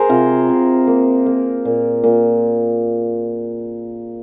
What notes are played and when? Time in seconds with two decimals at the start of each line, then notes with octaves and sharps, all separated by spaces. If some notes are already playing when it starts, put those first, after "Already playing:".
Already playing: G#4 A#4 C5
0.09 C3 F4
0.49 C3
0.87 A#3
1.26 A#3
1.65 A#2
2.04 A#2